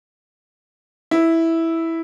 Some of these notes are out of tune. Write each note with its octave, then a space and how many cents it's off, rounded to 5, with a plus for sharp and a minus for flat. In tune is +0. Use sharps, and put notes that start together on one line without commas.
E4 -5